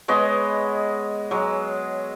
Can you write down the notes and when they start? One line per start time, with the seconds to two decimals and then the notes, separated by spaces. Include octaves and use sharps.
0.08 G#3 B3 C#5 D#5
1.31 F#3 G#3